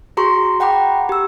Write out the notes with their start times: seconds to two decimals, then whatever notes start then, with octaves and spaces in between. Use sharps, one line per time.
0.17 F#4 G#4 A#5 C6 C#6
0.60 F#5 G5 A#5 B5 D6
1.09 G4 E6